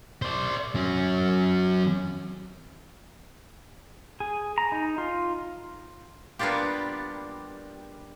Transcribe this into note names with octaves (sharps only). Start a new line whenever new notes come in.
C5 D5
F#3 C#4
G#4
A#5
D#4
F4
G3 A#3 B3 D4 F4 G4